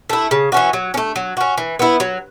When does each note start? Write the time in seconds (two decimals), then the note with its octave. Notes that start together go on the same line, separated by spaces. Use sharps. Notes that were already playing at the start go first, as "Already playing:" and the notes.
0.09 A3 E4
0.31 C#3
0.52 E3 C#4 F#4
0.73 F#3
0.94 C#4
0.97 A3
1.16 F#3
1.37 C#4 F#4
1.58 E3
1.79 B3 E4
2.00 F#3